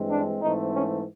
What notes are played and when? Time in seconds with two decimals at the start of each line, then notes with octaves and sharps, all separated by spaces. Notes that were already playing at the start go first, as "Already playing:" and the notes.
Already playing: G2 E3 G#3 C4
0.10 D4
0.41 G#2 E3 A3 C4 D#4
0.73 C#4